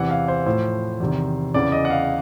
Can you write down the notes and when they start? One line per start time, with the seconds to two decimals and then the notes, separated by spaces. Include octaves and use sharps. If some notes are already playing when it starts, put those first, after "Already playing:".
Already playing: E2 C3 E3 F#5
0.10 F5
0.28 C5
0.46 A2 F3 C5
1.00 E2 C3 D#3
1.54 E2 C#3 E3 D5
1.72 D#5
1.85 F#5
1.90 F5